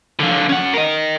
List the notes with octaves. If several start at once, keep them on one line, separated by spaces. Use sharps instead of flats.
D3 F3
C#4 F#5
A#4 D#5